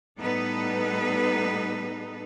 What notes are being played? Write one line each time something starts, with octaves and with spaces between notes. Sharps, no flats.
A2 G3 B3 D#4 A4 B4